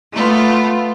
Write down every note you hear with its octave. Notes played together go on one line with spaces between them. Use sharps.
A3 B3 F4